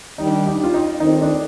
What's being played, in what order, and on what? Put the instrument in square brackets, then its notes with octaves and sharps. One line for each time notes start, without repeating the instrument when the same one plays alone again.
[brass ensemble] D#3 G3 D4 [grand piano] D#4
[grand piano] G4
F4
D#4
[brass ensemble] D#3 A3 C4 [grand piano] D#4
[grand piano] D4